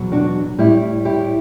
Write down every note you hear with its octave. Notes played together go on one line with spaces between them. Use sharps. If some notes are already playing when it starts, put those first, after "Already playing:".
Already playing: E2 B2 F#3
D4 F#4
A2 G3 E4 G4
E4 G4